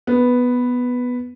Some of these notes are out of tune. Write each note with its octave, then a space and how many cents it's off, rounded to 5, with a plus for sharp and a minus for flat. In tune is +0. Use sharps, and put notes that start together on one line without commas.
B3 +0 B4 -5